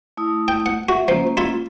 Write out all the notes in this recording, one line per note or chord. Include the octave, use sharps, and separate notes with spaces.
A3 E4 D#6
G5
F#5
F#4 E5
F3 A#3 C#4
E4 F4